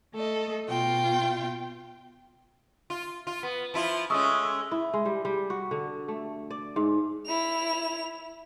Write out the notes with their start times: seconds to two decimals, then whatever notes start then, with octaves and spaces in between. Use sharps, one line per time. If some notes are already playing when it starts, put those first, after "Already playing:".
0.15 A3 A4 D#5
0.67 B2 F4 G5
2.90 F4
3.27 F4
3.43 B3
3.74 F3 E4 F4
4.10 G#3 A3 C#4 C#6 D#6 E6
4.45 E6
4.71 E4
4.93 G#3
5.05 G3
5.25 G3
5.50 F#4
5.71 D3
6.08 A3
6.51 D5
6.76 G#2
7.26 E4 F7